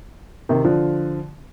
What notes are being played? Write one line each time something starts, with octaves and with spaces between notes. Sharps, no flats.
C3 D#3
D3 F3